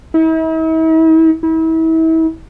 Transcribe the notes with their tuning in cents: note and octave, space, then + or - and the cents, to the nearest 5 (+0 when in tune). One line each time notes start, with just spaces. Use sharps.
E4 -45
E4 -35